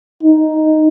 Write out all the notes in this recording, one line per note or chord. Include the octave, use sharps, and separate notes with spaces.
D#4